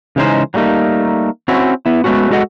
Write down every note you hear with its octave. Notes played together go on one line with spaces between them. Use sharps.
C#3 E3 G#3 C#4 D#4 C5
F#3 G3 A3 A#3 D#4
C4 C#4 E4 F#4
B3 E4
G#3 A3 B3 C#4 F#4
G#3 F#4 A4 D#5 F#5